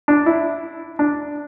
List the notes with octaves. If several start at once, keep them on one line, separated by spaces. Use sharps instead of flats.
D4
E4
D4